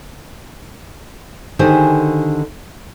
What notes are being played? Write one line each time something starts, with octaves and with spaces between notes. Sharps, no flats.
D3 D#3 G4 G#4 C5 G#5